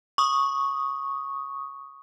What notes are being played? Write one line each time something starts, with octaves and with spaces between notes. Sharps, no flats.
C#6 D#6